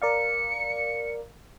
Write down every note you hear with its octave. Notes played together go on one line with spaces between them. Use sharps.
A#4 D5 F5 C#7